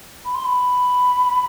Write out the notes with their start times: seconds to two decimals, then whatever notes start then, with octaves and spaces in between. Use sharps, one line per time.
0.25 B5
0.35 C6
0.45 B5